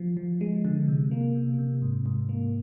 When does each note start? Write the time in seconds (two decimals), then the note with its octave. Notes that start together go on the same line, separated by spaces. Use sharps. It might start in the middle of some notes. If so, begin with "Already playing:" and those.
Already playing: F3
0.17 F3
0.41 G#3
0.65 D3
0.88 C3
1.11 A#3
1.35 C3
1.59 C3
1.82 G#2
2.06 G#2
2.29 A#3